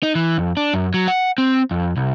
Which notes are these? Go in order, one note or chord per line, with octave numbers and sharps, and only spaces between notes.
D#4
E3
F2
D4
F#2
F#3
F#5
C4
F2
C2